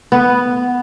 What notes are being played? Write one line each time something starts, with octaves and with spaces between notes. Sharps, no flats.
B3